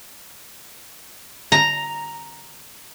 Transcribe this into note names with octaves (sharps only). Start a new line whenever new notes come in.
A#5